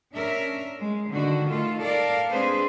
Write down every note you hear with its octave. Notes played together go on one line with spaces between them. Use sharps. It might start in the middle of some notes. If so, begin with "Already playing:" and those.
C#4 D4 A#4 E5
G#3
D3 D#3 F#4
D#3 A3 F4 A4
A4 A#4 D5 F5
G#3 C4 D4 G#4 B4 C5